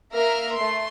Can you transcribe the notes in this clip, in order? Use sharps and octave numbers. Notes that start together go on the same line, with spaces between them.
A#3 A#4 E5 F6
A3 C6